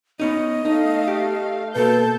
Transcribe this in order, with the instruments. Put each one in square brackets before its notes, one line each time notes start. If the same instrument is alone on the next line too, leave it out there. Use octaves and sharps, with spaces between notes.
[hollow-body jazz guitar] B3 C#4 D#4 [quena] D#5
[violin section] A3 F5 [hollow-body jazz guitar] D#4
[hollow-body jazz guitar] G4
[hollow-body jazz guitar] B2 A#3 [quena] A4 [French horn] B4 [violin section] A5 G6